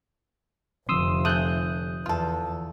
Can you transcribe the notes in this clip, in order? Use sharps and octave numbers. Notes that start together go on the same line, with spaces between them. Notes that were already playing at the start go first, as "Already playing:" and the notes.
F1 D3 F3 C4 C6 D#6 E6
F3 A3 G#4 D#6 F#6 G6
E2 F4 A4